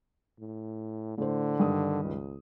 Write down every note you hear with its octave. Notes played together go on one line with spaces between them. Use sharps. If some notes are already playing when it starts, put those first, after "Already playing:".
A2
A2 D3 C5
G2 D#3 D#6
C#2